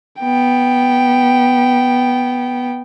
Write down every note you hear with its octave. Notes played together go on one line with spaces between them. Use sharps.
B3 G5